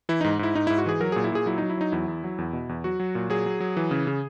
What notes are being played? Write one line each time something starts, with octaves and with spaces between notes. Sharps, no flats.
E3 E4
G#2 D#4
G#2 E4
G#2 D#4
G#2 E4
F#4
E3 G#4
F#3 A#4
A#2 G#4
E4
A#2 G#4
F#3 E4
F#3 D#4
E4
F#3 D#4
E2 E4
E2
F#3
E2
B2
E2
F#3 F#4
F#3
A#2
F#3 G#4
F#3
F#3
E3
C#3
C#3